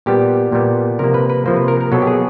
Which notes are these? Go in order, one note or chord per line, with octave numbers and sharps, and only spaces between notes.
A#2 G3 B3 G4
A#2 G3 B3
C3 F3 A#3 A#4
B4
B4
C3 F3 A#3 C5
B4
A#4
A#4
B2 F#3 B3 A4
G4
G#4